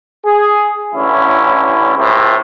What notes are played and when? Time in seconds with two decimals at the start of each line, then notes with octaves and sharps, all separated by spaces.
0.25 G#4
0.95 A1 D3 C#4 E4
1.97 C#2 A2 C3